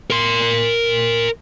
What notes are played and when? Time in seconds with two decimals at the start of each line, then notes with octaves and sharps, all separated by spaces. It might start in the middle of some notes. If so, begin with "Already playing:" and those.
0.10 A#4 C6